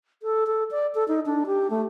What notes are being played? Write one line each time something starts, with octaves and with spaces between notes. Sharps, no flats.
A4
A4
D5
A4
D#4
D4
G4
A3